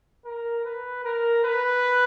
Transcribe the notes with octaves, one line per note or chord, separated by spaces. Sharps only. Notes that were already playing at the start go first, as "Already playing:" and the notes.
A#4
B4
A#4
B4